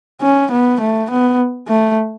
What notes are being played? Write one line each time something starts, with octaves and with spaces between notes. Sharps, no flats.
C#4
B3
A3
B3
A3